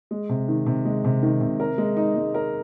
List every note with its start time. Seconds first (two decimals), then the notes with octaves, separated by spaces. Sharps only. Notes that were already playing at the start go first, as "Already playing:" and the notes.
0.11 G#3
0.29 C3
0.48 D#3
0.66 C3
0.85 G#3
1.04 C3
1.23 D#3
1.41 C3
1.60 A#4
1.78 G#3
1.97 D#4
2.16 G#3
2.34 A#4